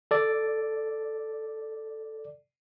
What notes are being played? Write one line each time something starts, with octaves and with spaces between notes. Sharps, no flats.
A4 D5